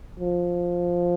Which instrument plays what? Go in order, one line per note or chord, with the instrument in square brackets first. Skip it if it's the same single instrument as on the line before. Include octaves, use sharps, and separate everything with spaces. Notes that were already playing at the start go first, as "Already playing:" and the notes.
[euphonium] F3